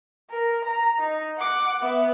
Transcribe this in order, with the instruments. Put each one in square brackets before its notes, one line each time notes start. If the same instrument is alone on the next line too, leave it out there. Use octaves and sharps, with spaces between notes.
[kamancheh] A#4
A#5
D#4
F#5 D6
B3 E5